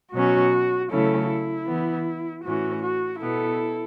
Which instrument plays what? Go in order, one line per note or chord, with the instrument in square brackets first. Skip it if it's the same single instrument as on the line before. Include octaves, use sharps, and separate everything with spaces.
[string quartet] B2 F#3 C#4 F#4
C#3 F#3 A3 C#4 E4 A4
E4
E3 B3
A2 E3 C#4 F#4
F#4
B2 B3 E4 A4